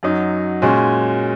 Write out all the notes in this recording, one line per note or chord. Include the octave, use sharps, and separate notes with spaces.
F#2 F#3 D#4
A#2 G#3 C#4 F#4